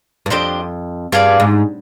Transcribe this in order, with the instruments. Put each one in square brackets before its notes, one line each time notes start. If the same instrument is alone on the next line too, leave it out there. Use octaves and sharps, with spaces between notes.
[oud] G2
[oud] F2 [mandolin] D4 G4 C5 D#5
[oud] G2 [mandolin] F4 G#4 D5 F5
[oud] G#2